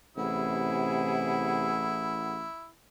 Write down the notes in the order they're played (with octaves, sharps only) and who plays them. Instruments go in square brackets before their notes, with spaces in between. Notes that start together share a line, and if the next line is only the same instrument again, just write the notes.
[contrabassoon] A1 [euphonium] C3 [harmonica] E4 [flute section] G#4 F#5 B5